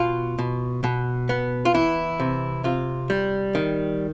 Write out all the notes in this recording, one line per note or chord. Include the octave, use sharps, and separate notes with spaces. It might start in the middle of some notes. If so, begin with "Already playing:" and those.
Already playing: B2 F4
B2
B2
B3
F4
E3 E4
C3
C3 F4
G3
D#3